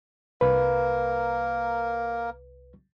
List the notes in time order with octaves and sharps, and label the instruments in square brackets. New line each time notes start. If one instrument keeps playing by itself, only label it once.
[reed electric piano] C2 B4 [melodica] A#3 A#4